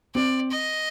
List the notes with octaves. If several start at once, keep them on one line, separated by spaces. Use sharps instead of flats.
C4 D5
D#5